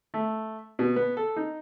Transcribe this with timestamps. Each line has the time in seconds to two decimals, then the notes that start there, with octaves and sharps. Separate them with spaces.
0.14 A3
0.79 B2
0.96 B3
1.17 A4
1.36 D#4